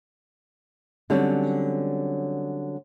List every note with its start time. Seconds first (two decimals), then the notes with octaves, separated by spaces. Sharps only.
1.10 D3 F#3 G3 C4 C#4